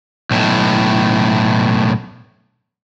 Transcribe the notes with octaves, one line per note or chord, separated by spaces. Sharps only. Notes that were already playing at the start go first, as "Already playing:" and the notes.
B1 A2